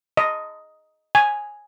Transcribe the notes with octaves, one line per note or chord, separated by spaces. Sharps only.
D#5
G#5